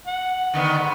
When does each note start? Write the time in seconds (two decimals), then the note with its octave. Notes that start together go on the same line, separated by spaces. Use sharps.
0.07 F#5
0.54 D3 D#3 B3
0.78 G#2